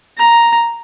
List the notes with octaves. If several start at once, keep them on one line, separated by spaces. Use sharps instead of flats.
A#5